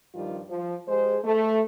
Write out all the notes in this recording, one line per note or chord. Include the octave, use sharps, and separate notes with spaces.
G2 D#3 F3 G3 F4
F3
G#3 G4 G#4 C5
A3